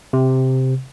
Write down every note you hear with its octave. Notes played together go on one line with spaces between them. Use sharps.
C3